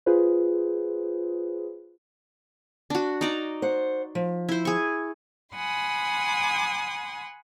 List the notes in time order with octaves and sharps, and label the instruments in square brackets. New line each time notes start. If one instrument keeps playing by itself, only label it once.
[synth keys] F4 G#4 B4 C5
[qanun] D4 F#4
D#4 D5 A#5
[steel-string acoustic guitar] C5 F#5
F3
[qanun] E4 C5
G#4 C#6
[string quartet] F#5 G#5 B5 C6 D#6